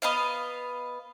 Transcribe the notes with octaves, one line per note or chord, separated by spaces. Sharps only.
B3 D#5 F5